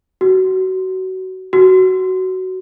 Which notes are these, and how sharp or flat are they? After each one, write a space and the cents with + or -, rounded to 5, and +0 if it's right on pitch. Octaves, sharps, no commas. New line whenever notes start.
F#4 +25
F#4 +15